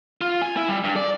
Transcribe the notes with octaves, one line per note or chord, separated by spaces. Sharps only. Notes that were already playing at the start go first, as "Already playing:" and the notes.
F4
G#5
E4
G3
G2
D5